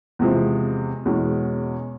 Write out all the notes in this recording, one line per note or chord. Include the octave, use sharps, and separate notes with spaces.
E2 C3 F3 G#3
E2 B2 G#3 C#4